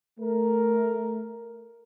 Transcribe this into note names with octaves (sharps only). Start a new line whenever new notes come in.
A3 A#4